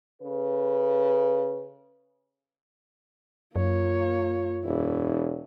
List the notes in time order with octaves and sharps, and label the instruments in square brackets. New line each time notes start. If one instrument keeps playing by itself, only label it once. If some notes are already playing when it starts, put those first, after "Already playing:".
[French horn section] C#3 A4 B4
[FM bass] F#2 [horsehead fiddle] A#3 C#5 [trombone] F4
[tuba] E1 [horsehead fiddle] E4